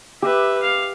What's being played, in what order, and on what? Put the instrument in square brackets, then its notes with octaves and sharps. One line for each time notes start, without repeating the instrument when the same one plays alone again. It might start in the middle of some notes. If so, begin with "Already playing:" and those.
[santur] G4 [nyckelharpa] B4 E5
[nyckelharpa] F5